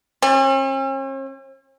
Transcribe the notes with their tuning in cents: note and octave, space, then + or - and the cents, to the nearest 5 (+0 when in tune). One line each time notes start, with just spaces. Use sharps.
F3 +45 C#4 -45